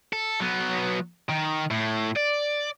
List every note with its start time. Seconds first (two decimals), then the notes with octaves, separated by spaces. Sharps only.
0.13 A4
0.40 F#3 B3
1.29 D#3
1.71 A2
2.17 D5